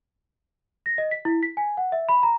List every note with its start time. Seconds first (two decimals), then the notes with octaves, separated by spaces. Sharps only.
0.86 A#6
0.98 D#5
1.11 B6
1.25 E4
1.43 B6
1.57 G#5
1.77 F#5
1.92 E5
2.09 B5
2.23 A#5